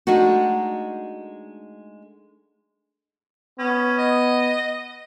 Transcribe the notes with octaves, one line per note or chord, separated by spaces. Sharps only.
G#3 A3 D4 D#4 F#4
B3 C#4
D#5